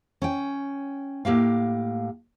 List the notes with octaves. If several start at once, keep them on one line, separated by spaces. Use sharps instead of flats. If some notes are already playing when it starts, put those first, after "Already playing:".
C#4 G5
A2 A#3 G4 F5